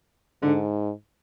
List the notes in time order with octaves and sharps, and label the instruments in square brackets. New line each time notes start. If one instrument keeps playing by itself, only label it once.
[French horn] G#2 [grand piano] D3